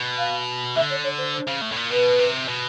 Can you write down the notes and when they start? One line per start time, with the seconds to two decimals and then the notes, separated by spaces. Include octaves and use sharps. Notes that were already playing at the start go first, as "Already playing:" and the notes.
Already playing: B2
0.18 F5
0.76 D3 E5
0.90 C#5
1.04 C#5
1.18 C5
1.33 C5
1.47 C#3
1.61 A2
1.72 A2
1.76 A#2
1.90 B2 B4
2.19 C3
2.48 B2